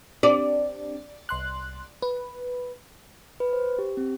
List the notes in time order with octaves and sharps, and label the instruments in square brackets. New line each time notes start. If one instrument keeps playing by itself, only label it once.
[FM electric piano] C4 D4 G4 [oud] D5
[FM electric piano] C2 C6 F#6
B4
[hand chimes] B4
C5
G4
C4